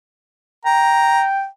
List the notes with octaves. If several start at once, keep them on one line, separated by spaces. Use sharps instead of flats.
G5 A#5